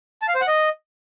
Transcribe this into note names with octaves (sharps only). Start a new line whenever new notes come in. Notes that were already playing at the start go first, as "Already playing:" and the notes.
A5
F5
C5
F#5
D#5